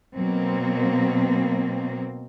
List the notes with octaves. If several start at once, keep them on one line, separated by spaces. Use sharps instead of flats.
B2 F#3 A#3 C4